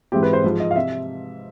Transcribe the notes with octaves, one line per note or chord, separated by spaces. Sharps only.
G#2 E3 G#3 C4 G4
B4
C5
G#2 F3 G#3
D#5
F5
C3 E5